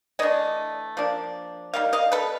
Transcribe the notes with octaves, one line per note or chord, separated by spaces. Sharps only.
E3 A3 D4 C#5 D#5
F3 A#3 D4
D#3 G3 A#3 F5
D#5 F5
A4 B4